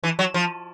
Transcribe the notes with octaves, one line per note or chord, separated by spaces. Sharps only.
E3
F#3
F3